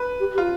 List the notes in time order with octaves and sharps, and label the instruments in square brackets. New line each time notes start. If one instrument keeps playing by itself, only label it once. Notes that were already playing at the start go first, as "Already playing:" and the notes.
Already playing: [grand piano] B4
[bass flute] G4
G4
[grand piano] F4